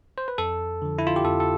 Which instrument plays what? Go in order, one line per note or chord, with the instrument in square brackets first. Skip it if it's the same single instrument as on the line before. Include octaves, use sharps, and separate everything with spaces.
[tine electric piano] C5
B4
F2 A4
D3 F3
E4
F4
G4
F2 A4
A4